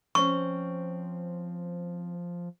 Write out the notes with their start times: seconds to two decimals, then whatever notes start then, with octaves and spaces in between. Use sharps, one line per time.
0.15 F3 C4 C#4 C5 C#6